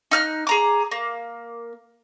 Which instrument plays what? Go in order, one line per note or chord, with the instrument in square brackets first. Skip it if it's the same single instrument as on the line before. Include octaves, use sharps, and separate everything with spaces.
[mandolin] D#4 F6 F#6
G#4 A#5 D6
A#3